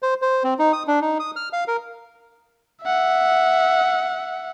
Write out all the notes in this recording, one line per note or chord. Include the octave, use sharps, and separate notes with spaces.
C5
C5
C4
D#4
D#6
D4
D#4
D#6
F6
F5
A#4
E5 F#5